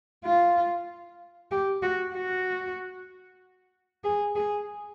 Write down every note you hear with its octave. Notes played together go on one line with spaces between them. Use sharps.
F4
G4
F#4
F#4
G#4
G#4